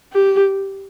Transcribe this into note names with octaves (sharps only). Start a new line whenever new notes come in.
G4